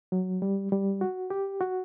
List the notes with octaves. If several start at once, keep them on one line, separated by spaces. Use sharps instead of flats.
F#3
G3
G3
F#4
G4
F#4